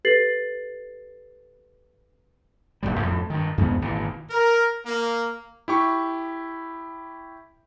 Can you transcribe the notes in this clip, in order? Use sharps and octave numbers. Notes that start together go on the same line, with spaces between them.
G4 A4 B4 A6 C7 F#7
D1 C#2 A#2 G3
F2 A2
G2 D#3
E2 G#2 C#3 B3
G#1 A#2 E3
A#4
A#3
E4 G4 C#6